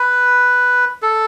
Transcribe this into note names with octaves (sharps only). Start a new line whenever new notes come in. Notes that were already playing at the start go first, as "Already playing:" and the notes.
Already playing: B4
A4